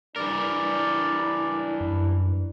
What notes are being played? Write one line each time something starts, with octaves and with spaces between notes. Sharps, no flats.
F#1 G2 E3 D4 A#4 D5
F#2